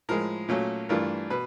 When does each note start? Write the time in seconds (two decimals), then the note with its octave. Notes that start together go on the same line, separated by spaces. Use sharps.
0.09 A2 F3 G#3 A#4
0.49 A#2 F#3 A3 C#4
0.89 G2 E3 A3 D4 F4 A#4
1.30 B2 B4